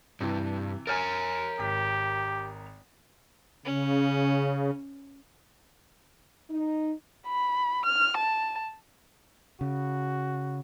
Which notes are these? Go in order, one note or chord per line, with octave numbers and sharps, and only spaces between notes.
G2 C3 E3
A#4 C#5 G#5 A#5 F6 A6
G#1 G4 B6
C#3 C#4
D#4
B5
F6
A5
C#3 F#4